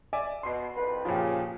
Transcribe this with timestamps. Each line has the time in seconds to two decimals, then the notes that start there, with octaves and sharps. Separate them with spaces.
0.13 D5 E5 G#5
0.43 B2 C6 C7
0.74 C2 F2 B4
1.05 A#2 C#3 F3 G4